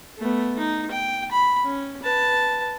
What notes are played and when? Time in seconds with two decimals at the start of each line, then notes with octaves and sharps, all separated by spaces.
0.18 A3 B3
0.58 D#4
0.91 G5
1.32 B5
1.65 C#4
2.03 B4 A5